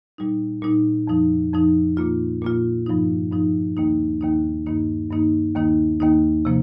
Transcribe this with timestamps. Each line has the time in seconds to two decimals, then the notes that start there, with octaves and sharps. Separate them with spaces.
0.18 A#2 G3 D#4
0.62 A#2 G3 D#4
1.07 F2 F3 D#4
1.53 F2 F3 D#4
1.97 A#2 A#3 F4
2.42 A#2 A#3 F4
2.86 G2 F3 D#4
3.32 G2 F3 D#4
3.77 D#2 D#3 A#3 D#4
4.21 D#2 D#3 A#3 D#4
4.66 G2 D#3 A#3 D#4
5.11 G2 D#3 A#3 D#4
5.55 D#2 D#3 A#3 D#4
6.00 D#2 D#3 A#3 D#4
6.45 C3 F3 A#3